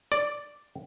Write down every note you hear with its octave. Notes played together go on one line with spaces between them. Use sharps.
D5